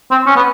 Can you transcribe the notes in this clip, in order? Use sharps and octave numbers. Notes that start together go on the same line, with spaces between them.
C4
C#4
B3